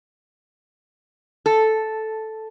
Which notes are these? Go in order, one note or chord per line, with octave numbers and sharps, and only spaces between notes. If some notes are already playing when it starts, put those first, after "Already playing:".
A4